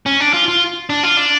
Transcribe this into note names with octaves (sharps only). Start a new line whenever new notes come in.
C#4
D4
F4
F4
D4
F4
D4